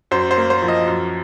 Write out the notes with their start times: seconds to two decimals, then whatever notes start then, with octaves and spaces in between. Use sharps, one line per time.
0.11 F#2 C5
0.31 C5
0.37 A#3
0.50 C5
0.62 F3
0.68 D#5
0.88 F#2